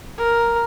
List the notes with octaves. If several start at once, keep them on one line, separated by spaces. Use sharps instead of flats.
A#4